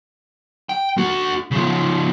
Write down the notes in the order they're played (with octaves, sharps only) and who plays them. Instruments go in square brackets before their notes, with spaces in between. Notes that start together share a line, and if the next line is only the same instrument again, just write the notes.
[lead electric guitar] G5
D4 F#4
C#3 F3